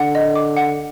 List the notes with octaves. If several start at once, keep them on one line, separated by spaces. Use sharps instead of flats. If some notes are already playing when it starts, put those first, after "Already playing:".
Already playing: D3 F#5
D#5
D6
F#5